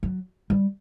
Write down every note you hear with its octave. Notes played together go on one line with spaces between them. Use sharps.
F#3
G3